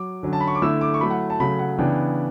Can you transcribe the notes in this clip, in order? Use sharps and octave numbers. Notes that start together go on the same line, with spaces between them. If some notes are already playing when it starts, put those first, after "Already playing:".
Already playing: F#3 D6
D3 F#3 C#4
A5
B5
C#6
D6
D3 A3 E4 E6
D6
C#6
F#3 A3 E4 B5
F#5
A5
C#3 F#3 A3 B5
F#5
C#3 E3 B3 D4 G5